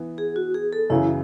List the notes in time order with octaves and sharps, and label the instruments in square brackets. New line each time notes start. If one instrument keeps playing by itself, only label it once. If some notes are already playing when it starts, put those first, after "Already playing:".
Already playing: [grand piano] E3 B3
[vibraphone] G#4
F#4
G#4
A4
[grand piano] F#2 C#3 E3 [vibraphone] E4